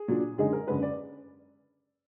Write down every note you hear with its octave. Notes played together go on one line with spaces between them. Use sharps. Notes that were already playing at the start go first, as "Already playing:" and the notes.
Already playing: G#4
A#2 F#3 D4
F#2 D3 G#3 D#4 G#4
A#4
F#1 F#2 D3 G#3 B4
D5